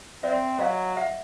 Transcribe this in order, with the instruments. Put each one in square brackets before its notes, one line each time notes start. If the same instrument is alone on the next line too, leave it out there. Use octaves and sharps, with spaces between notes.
[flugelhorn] C4 [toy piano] D5 E5
[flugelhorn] F#3 [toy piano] D#5 F5
[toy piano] E5 F#5